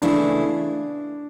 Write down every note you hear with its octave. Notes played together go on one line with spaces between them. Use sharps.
C#3 E3 A3 D4 E4